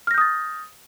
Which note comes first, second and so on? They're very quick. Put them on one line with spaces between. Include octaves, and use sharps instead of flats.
F6 A#6 G6 D#6 A6